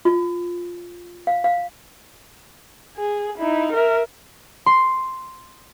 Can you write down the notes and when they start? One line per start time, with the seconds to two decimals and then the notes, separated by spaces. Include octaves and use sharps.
0.05 F4
1.27 F5
1.44 F5
2.97 G#4
3.38 D#4 E4
3.72 A#4 E5
4.66 C6